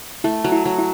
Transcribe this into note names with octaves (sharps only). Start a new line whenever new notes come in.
A3 E4
F#3
E4
F#3
E4